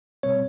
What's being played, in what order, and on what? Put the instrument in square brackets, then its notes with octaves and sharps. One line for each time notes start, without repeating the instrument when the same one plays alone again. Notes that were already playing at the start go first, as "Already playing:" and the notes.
[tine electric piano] B2 G3 C4 C#5